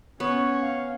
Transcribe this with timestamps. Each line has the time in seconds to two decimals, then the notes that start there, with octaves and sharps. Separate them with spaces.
0.20 B3 C#4 C#5 C#6
0.61 F5